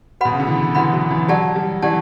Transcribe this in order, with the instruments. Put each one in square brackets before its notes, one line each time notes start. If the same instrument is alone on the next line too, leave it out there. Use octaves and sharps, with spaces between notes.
[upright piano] B2 [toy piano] F#4 B4 F#5 B5
[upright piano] C#3
D3
E3
[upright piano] E3 [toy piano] F#4 B4 F#5 B5
[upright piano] F#3
E3
[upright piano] F#3 [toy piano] G4 D5 F#5 A5
[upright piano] G3
[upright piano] E3 [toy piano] G4 D5 F#5 A5